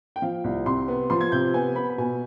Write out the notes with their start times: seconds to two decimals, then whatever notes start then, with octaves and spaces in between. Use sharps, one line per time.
0.16 G5
0.22 F3 F5
0.44 C2
0.66 C3 C6
0.88 B3
1.10 F3 C6
1.21 G#6
1.32 C3 G6
1.54 B3 G#5
1.75 B3 B5
1.90 B5
1.98 B2 G#5